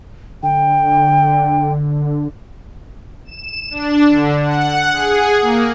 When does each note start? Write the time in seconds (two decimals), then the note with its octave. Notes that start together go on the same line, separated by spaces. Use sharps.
0.43 D3 G5
3.25 E7
3.71 D4
4.08 D3
4.44 F#5
4.93 G#4
5.42 A#3